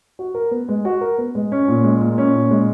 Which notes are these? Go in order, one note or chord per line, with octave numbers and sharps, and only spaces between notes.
F#4
A#4
B3
G#3
F#4
A#4
B3
G#3
C#4
A#2
G#3
A#2
C#4
A#2
G#3